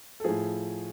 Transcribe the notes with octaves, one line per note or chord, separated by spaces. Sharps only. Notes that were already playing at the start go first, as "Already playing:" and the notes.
A4
A2 F3 G#4